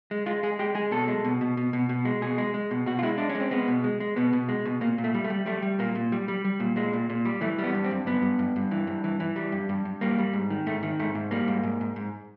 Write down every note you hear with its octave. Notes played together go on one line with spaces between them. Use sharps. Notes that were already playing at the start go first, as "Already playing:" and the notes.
G#3
G#3 F4
G#3 G#4
G#3 G4
G#3 G#4
B2 A4
G#3
B2
B2
B2
B2
B2
G#3
B2 G#4
G#3
G#3
B2
B2 F#4
F4
G#3 E4
G#3 D4
C#4
G#3
C4
G#3 B3
B2
G#3
G#3
B2 B3
B2
G#3
B2
A#2 A#3
A#2
A3
G3
A3
G3
G3 A3
G3
A#2 A#3
A#2
G3
G3
G3
A#2
A#2 G#3
A#2
A#2
G3
E3 A3
G3
B3
G2
C4
G2
G2 B3
G2
G2
G2
E3
G2
E3
E3
G3
G2
G2
G2
G3 A#3
G3
G#2
D#3
G#2 A3
D#3
G#2 A3
G#2
G3 A#3
G#2
G#2
G#2
G#2